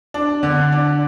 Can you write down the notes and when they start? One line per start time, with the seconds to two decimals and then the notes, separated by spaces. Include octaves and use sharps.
0.14 D4
0.43 D3
0.72 D4